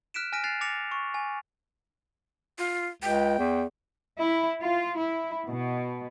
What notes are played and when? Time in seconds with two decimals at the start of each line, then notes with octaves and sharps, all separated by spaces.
0.14 F6 F#6 B6 D7 E7
0.32 G#5 F6 A#6 B6 D7 D#7
0.44 F#6 A6 C7 F7
0.61 D6 A6 A#6 C#7 F7
0.91 C#6
1.14 G#5
2.59 F4
3.03 C#2 G5
3.39 E2
4.20 E4
4.62 F4
4.98 E4
5.48 B2